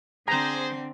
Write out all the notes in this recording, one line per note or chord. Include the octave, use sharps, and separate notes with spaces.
D3 C4 G#4 C5 A#5